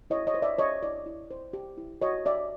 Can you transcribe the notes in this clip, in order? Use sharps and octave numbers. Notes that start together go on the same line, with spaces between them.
E4 C#5 D#5
C#5 D#5
C5
D5 E5
G4 C#5 D#5
E4 D5
E4
C5
G4
E4
F#4 C#5 D#5
C#5 D5 E5